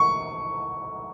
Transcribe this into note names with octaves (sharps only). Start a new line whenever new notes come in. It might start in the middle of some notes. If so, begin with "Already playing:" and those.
Already playing: C#6